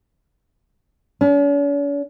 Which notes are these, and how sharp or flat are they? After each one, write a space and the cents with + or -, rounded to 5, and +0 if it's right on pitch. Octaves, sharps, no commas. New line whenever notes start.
C#4 +45